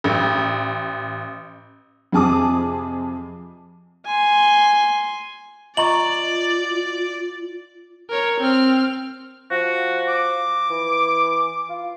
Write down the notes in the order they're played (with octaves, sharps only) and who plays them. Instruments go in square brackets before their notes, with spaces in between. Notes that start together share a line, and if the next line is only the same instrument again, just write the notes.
[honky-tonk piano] A1
F2 C3 G#4 A5 D6 D#6
[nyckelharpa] G#5 C6
[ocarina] F4 [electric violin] D5 [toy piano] D#5 A#5 C#6 [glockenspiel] F#7
[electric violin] A#4 C#5
C4 F6
[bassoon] F3 [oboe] F#4
[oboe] D6
[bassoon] E3
F4